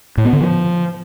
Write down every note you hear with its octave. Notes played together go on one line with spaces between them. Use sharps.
A2
B3
D3
F3